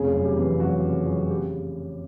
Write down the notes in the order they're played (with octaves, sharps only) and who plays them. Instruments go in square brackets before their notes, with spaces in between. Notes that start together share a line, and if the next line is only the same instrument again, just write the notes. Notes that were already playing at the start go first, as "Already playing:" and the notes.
Already playing: [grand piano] F1 C#3 G#4
F#2
G4
E3
F#2 F#4
C#3
F#2
C#3 G4